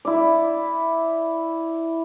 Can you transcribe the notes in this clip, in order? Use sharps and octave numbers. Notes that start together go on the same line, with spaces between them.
E4 D5